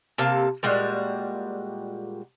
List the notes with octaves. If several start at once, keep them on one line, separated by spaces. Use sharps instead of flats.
C3 A#3 A4 F5
A#2 G3 G#3 F#4